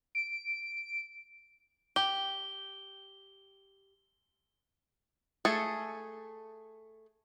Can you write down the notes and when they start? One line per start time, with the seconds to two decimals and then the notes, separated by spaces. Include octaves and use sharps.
0.15 D7
1.96 G4 G7
5.45 A3 G#4 A4